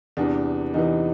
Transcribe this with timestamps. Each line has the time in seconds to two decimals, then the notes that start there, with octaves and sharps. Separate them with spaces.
0.17 E2 C3 E3 D4
0.74 E2 C3 E3 D#4